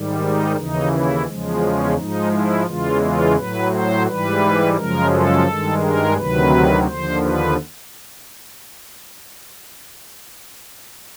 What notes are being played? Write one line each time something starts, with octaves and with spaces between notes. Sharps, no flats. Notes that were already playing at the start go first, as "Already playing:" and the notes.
Already playing: G#2 D#3 G3
D#4
D#2 C#3 E3 D#4
E4
E2 C#3 F3 G#3
C#4
G#2 F3 G#3 D#4
E4
E2 C#3 E3 G#3 F4
F4
A2 F#3 B4
C5
G#2 E3 G3 B4
F#2 C#3 F3 G#3 A#4
A4
G2 D#3 G#3
A#4
D2 C3 D#3 F#3 B4
D#2 D3 F3 C5
B4